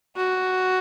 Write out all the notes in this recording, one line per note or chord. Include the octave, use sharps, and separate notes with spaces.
F#4